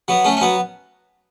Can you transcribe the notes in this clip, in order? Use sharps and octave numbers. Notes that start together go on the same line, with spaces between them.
F#3 B3
A3 C#4
C#4
F#3 B3